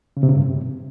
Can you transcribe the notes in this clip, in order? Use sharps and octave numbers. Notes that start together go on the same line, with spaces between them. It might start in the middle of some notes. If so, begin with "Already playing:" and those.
C#3
C3
C#3
G2
C3